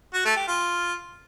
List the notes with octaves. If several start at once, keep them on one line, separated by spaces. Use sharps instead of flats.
F#4
A3
G4
F4